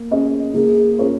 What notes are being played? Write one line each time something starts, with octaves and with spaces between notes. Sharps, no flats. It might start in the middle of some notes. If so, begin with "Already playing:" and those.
Already playing: A#3
C#4 G#4 D#5
A#3 G#4
C#4 F4 A#4 C#5